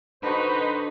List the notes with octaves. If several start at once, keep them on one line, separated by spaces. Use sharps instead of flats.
D3 D#4 F#4 B4 C5 C#6